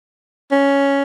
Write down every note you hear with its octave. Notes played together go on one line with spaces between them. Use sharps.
C#4